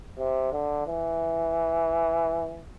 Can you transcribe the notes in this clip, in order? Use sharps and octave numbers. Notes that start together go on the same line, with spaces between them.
C3
D3
E3